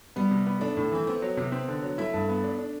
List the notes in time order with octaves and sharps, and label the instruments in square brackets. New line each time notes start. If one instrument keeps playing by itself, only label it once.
[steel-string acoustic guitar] G3 [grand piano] B3
[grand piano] C3
B3
[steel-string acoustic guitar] A3 [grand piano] D4
[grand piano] A2
[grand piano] E3 [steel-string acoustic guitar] C4
[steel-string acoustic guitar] B3 [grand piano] C4
[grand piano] F#3
C3
C4
D3
F#3
[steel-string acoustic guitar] A3 [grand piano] E4
[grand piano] G2
B3
D4
D4